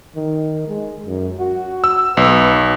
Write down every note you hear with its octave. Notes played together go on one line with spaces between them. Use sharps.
D#3
G#3
F#2
F#4
E6
B1 B4